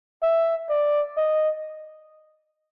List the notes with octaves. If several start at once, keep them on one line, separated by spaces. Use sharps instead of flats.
E5
D5
D#5